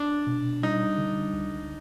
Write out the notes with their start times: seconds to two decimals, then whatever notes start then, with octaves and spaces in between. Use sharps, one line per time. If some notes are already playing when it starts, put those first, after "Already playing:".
Already playing: D4
0.27 B2
0.63 G3 D#4
0.98 D3
1.33 C#2